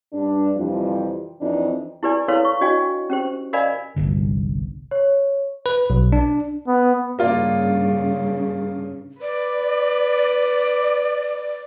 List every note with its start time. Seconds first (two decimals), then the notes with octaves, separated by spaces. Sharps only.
0.13 G2 D4
0.57 F2 C3 E3 F3 G3
1.41 F2 E3 C4 D4 D#4
2.03 E4 G4 B4 D5 G#5
2.28 E4 A4 B4 C#5 F5 C6
2.45 C#6
2.61 D4 F#4 D#5 G5 G#5 C#6
3.10 C#4 G4 C5
3.53 A#4 D5 D#5 F5 G#5 B5
3.96 G1 C2 G2 D3
4.91 C#5
5.66 B4
5.90 B1
6.13 D4
6.67 B3
7.19 G2 C#3 A#3 F4 D5
9.22 B4 D5